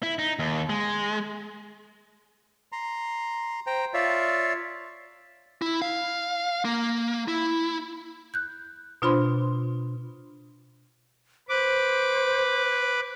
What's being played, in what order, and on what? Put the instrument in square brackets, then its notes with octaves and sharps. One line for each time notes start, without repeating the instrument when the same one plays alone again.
[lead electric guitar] E4
D#4
D#2
G#3
[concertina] A#5 C6
C5 G5 A#5
F4 C#5 D5 E5 F5
[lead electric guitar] E4
F5
A#3
E4
[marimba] F#6 G6
B2 D4 F4 C5 B5 C6
[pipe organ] B4 D6 [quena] C5